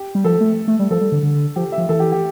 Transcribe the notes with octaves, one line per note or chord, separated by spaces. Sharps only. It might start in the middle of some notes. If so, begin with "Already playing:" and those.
Already playing: G4
G3
F3 A4
A3
A3
G3
F3 A4
G3
D3
D3
F3 G4
E5
F3
E3 A4
G4
G4